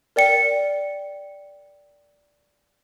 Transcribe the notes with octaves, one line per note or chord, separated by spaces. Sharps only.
A#4 D5 G5 C#7